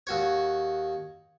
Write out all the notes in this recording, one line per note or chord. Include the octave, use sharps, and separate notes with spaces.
D#2 F#4 C#5